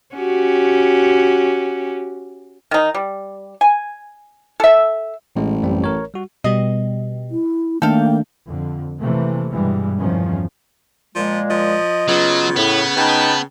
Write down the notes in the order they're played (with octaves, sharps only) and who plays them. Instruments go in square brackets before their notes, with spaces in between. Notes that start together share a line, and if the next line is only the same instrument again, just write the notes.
[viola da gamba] C#4 F#4 G4
[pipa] D#3 D#4
G3
G#5
A4 E5
[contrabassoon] A1 [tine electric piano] A2 G#3
[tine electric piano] F#2 G3 C4
A#4 C#5
G3 F#4
[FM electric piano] B2 G3 [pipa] D#5
[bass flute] E4
[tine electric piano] D#3 A3 D4 [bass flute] A#3 [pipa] A4 F5 [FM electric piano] G5
[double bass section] F2 D3
C3 E3 A3 A#3
G2 B2 E3 G3 G#3
E2 G2 C3 D#3 F3 C#4
[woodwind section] A#2 G#3 [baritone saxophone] F3
[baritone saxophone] F3 [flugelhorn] D#5
[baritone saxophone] C#3 [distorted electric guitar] F#3 [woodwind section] B3 F4
[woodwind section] A2 [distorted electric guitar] B3
[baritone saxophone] C#3 [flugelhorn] D#4 [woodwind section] B4 G5 A5